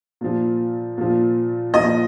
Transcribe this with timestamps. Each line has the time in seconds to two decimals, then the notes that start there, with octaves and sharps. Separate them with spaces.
0.21 A#2 F3
0.98 A#2 F3
1.74 A#2 F3 D#5